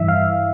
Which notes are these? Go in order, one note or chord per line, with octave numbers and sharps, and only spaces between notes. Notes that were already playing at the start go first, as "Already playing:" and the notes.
Already playing: G2 E3 E5
F5